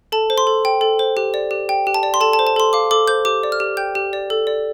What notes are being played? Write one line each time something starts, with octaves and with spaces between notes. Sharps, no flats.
A4 A5
C5
C6
A4
G5
A4
C5
G4
D5
G4
G5
G4
A5
D5
C6
A4 A5
A5
C5
A5
A4 C6
F5 D6
A4 D6
C5 G6
G4 D6
D5
F6
G4
G5 G6
G4
D5
A4
D5